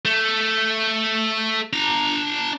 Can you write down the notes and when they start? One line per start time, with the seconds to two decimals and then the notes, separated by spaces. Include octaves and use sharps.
0.05 A3
1.73 D4 A#5